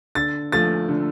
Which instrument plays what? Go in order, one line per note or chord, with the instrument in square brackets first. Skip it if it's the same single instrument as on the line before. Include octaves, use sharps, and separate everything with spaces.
[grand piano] D3 A6
F3 A3 A6
D3